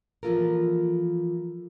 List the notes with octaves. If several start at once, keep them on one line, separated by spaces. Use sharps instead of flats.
E3 F3 A#3 F4 A4 A#4